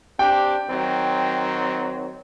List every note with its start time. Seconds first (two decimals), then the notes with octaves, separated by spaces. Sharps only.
0.19 C4 D4 G4 G5
0.70 D#3 F#3 C4